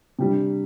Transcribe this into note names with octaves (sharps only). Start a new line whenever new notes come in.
C3 G3 D4 G4